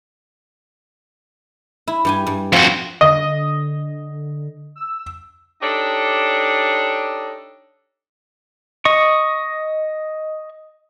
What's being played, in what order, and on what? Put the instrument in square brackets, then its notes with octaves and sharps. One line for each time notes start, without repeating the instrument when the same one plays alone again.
[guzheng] E4
G2 G4 G#5
G2
[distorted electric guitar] F2 F#4 [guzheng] F4 G5
[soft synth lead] D3 [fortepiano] D#5
[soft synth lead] E6
[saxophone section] D4 D#4 G4 A4 C#5 D5
[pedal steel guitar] D#5 C#6